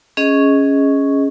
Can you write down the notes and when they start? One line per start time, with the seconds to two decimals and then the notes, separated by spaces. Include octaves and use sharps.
0.17 C#4 G#4 D#5 C#6